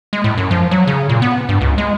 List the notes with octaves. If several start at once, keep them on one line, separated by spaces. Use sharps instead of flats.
G#3
A2
F#2
F3
F#3
C#3
A#2
B3
G2
C#2
G#3